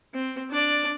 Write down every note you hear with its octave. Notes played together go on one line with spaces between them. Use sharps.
C4
D4 D5